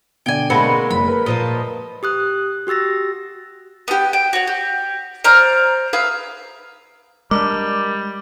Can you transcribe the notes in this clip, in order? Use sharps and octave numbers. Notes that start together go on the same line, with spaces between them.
B2 D3 D5 G5 G#5
G#3 A#3 C4 F#4 B4 A5
F#1 B5
A#4 B4
A#2 F3 A#3 D#5
G4 D#6 F#6
F#4 G4 E6 A6 A#6
B3 G4
G5
F#4 C#5
G4
C5 D5 A#5 F6
G#4 B4 E5 F5
G3 G#3 D4 A#4 D6